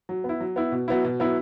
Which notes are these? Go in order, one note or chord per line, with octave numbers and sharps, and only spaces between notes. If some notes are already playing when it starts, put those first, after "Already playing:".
F#3
B3
E4
F#3
B3 E4
B2
F#3 B3 E4
B2
F#3 B3 E4